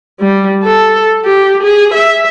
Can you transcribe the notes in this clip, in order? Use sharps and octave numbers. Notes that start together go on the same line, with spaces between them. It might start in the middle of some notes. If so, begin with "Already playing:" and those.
G3
A4
G4
G#4
E5